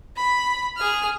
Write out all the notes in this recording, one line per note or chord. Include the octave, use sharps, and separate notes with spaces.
B5
G#4 F6